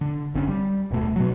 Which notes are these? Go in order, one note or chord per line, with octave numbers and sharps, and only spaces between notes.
D3
G1 D3 C4 C#4
G3
D#1 B2 A3
B2 F#3